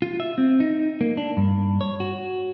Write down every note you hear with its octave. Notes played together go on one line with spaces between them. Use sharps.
F4
E5
C4
D#4
A#3
D4
G2
C#5
F#4